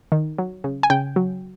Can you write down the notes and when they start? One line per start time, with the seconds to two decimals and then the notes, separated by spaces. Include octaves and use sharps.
0.12 D#3
0.38 F#3
0.64 C#3
0.83 G#5
0.90 C#3 G5
1.16 F#3